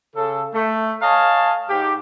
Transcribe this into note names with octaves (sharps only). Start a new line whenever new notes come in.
C#3 A4
A3
C#5 D#5 F5 G#5 A5
G#2 G4